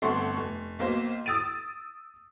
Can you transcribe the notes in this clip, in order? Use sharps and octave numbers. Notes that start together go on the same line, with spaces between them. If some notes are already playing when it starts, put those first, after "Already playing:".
G1 A3 C4 F#5 C6 C#6
F1
B1 A#3 C5
D#6 E6 A6 D7 D#7